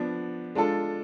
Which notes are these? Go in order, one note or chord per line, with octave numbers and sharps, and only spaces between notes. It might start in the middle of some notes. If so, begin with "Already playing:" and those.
Already playing: F3 B3 D4
G#3 D4 F4 A4